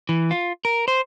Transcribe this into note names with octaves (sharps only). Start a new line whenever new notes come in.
E3
F4
A#4
C5